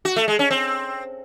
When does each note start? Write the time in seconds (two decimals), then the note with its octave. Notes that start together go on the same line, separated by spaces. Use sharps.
0.05 F#4
0.16 A3
0.28 G#3
0.39 C#4
0.51 C4